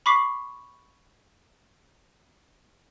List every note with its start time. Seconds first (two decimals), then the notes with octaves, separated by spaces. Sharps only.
0.06 B5 C#6 D6 B6 C7